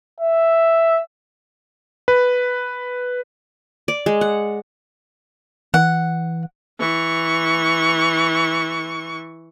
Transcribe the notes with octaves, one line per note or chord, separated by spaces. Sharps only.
E5
B4
D5
G#3
F#5
E3 F#5
E3 C#6